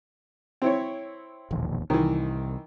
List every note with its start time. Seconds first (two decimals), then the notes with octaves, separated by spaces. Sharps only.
0.62 C4 E4 C#5
1.51 E1 A#1 D#2
1.90 C2 D#3 E3